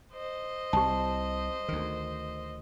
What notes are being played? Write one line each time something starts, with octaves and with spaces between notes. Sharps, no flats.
C5 D#5
C2 G4 A5
D2 D#3